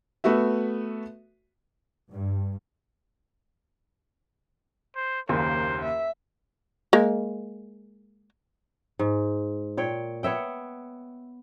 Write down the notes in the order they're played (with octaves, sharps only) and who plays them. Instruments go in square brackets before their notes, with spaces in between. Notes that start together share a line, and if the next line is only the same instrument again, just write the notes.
[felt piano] A3 B3 F#4 E5
[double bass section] G2
[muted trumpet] C5
[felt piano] F#1 D#2 [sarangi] A#3 [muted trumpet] C5
[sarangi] E5
[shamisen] G#3 A#3
[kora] G#2
A#2 C#5 G5
B3 C#5 E5 G5